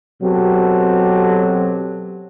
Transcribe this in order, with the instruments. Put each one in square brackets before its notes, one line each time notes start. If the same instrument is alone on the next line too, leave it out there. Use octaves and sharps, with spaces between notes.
[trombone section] B2 F#3 C4 G4 A4